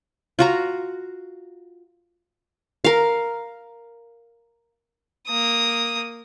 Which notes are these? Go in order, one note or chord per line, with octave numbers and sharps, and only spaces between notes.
F4 F#4 A#5
A#4 F5
A#3 D#6